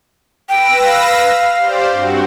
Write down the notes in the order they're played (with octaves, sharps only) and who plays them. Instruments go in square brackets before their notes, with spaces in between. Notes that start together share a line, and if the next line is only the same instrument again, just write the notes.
[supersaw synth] B4 E6 A#6 [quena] G5
[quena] F5
[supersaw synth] G4 C5 D5
G2 C4 F#4